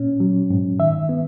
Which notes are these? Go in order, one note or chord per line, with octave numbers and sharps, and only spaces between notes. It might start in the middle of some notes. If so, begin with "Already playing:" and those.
Already playing: A#2 C#4
F#3
G#2
D#3 E5
B3